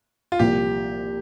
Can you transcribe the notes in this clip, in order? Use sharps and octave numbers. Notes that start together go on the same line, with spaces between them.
F4
C2 A#2 F3 G4